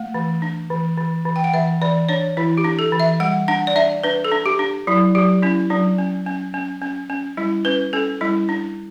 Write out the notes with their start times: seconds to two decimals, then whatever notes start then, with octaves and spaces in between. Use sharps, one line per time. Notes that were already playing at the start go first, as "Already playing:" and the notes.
Already playing: A3 F#5
0.14 E3
0.42 D4
0.70 E3
0.97 E3
1.25 E3
1.36 G5
1.44 F#5
1.54 E3 E5
1.82 E3 D5
2.09 D4 C#5
2.37 E3 E4
2.58 G4
2.65 D4
2.79 A4
2.92 E3
3.00 E5
3.20 G3 F#5
3.48 D4 F#5
3.67 D5
3.76 D4 E5
4.04 D4 B4
4.25 A4
4.32 D4
4.46 G4
4.59 D4
4.87 F#3 E4
5.15 F#3 G4
5.43 C#4 E4
5.70 F#3 D4
5.98 C#4
6.27 C#4
6.54 C#4
6.82 C#4
7.10 C#4
7.37 G3 E4
7.65 C#4 B4
7.93 C#4 A4
8.21 G3 E4
8.49 D4